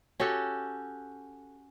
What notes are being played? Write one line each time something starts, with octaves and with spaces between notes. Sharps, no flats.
C#4 F#4 G4 A4